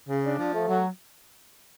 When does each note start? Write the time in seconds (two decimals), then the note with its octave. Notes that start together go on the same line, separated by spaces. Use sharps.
0.09 C#3
0.24 D4
0.39 F3
0.54 A3
0.68 F#3